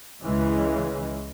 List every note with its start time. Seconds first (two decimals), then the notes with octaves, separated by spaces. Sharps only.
0.22 C#2 C#3 E3 G#3